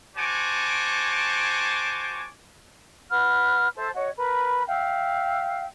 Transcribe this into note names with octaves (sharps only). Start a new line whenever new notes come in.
F#4 C5 C#5 G#5 A5 D6
B4 F#5 B5 F6
A4 C5 E5 A5
F#4 C#5 D#5 F#5
A#4 B4 B5
E5 F5 G5